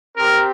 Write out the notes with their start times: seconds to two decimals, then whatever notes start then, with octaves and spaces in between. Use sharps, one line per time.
0.17 C4 G4 A#4